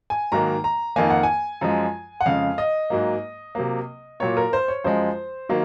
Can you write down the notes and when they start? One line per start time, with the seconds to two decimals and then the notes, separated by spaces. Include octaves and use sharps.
0.10 G#5
0.32 G#2 D#3 F#3 A#3 A#5
0.64 A#5
0.96 F2 D#3 A#3 G#5
1.10 F#5
1.23 G#5
1.61 F#2 F3 G#3
2.21 F#5
2.26 F2 C#3 G#3 F5
2.58 D#5
2.90 G#2 F#3 A#3
3.55 C3 F#3 A#3
4.20 A#2 F#3 A#3 C#5
4.37 A#4
4.53 C5
4.68 C#5
4.84 F#2 F3 G#3 C5
5.49 D#3 F#3 A#3